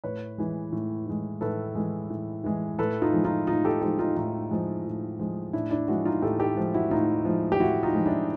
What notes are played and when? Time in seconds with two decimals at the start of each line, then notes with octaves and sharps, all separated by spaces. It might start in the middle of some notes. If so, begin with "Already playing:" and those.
0.04 A2 B4 C#5
0.38 E3 G#3
0.72 A2
1.06 E3 G#3
1.41 A2 A4 B4
1.75 E3 G#3
2.10 A2
2.44 E3 G#3
2.79 A2 A4 B4
3.02 D#4 F4
3.13 F3 G#3
3.25 D#4 F4
3.47 A2 D#4 F4
3.65 G4 A4
3.81 F3 G#3 F4 G4
3.99 D#4 F4
4.16 A2 D#4 F4
4.51 F3 G#3
4.85 A2
5.19 F3 G#3
5.53 A2 D4 E4
5.71 D4 E4
5.88 F3 G#3 E4 F#4
6.05 D#4 F4
6.22 A2 G4 A4
6.40 G4 A4
6.57 F3 G#3
6.74 E4 F#4
6.91 A2 D#4 F4
7.25 F3 G#3
7.52 G4
7.60 A2 E4 F#4
7.83 D#4 F4
7.94 F3 G#3
8.06 D4 E4